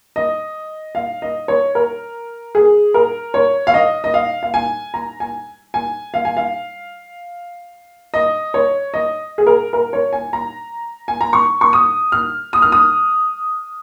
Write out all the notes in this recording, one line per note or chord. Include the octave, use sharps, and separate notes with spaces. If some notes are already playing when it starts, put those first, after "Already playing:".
D#5
F5
D#5
C#5
A#4
G#4
A#4
C#5
F5
D#5
D#5
F5
F5
G#5
A#5
G#5
G#5
F5
G#5
F5
D#5
C#5
D#5
G#4
A#4
A#4
C#5
G#5
A#5
G#5
A#5
C#6
C#6
D#6
F6
D#6
F6
D#6